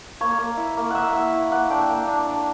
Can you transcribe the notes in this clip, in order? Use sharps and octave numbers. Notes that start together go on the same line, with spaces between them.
A#3 C#5
A#3
E4
A#3
A#3 E5 F#5
E4 E5 F#5
E4
A#3 F#5
D4 G5
A#3
D4
D4